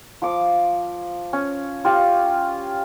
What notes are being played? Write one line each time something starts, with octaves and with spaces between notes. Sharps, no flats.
F3 D6
C#4
F4 G4